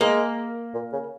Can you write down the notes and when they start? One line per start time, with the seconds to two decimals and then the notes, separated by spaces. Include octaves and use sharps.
0.01 G#3 A#3
0.74 A#2
0.93 C#3